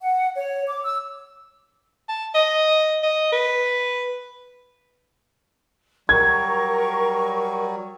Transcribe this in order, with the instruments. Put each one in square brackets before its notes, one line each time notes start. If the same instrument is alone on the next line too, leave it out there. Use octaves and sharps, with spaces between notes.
[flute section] F#5
C#5
D6
E6
[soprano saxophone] A5
D#5
D#5
B4
[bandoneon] F#3 G3 [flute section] A#4 C#6 [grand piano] G#6